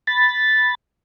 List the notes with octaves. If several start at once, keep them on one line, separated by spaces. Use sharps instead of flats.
B5 A6